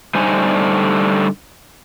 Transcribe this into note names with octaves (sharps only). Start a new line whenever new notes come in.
D3 G3 A3 D#4 C5 G#5